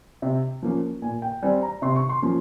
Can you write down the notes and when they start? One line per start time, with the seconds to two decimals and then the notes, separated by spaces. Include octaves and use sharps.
0.22 C3
0.62 F3 A#3 C#4
1.02 A#2 G#5
1.22 G5
1.42 G3 C4 G#5
1.63 A#5
1.82 C3 C6
1.96 C#6
2.09 C6
2.22 F3 A#3 C#4